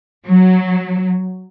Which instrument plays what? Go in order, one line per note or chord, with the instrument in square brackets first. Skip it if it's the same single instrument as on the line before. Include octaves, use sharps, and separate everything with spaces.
[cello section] F#3